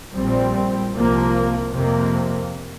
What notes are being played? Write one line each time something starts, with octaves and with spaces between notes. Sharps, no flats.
A#1 A#2 G3 C4
C2 C3 F3 A#3
F2 C3 A#3